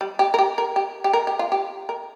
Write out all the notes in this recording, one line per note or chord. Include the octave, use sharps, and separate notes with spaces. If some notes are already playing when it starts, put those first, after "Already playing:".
G3
G4
A#4
G4
A#4
G4
G4
A#4
G4
F4
G4
A#4